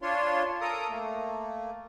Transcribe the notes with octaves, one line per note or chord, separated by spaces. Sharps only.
D4 F4 C#5 C6
A4 A#4 A#5 D#6
A3 A#3